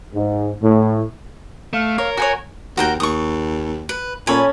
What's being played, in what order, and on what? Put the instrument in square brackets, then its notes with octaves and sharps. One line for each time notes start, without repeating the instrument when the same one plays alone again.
[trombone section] G#2
A2
[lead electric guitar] A3 [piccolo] F5
[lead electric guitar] A#4 [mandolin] C#5
[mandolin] F#4 B4 C#5 [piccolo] G#5
[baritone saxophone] D#2 [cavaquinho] F#4 A#4 G5
[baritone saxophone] D#2 [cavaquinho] C#6 D#6
[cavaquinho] B4
[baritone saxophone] A#2 [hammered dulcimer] C#4 A4 [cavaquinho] G#5 B5